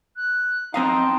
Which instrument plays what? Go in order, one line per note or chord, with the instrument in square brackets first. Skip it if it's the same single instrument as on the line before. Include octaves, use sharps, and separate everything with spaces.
[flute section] F#6
[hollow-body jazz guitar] C4 D#5 F5 [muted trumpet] D#4 [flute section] G5 A5 C6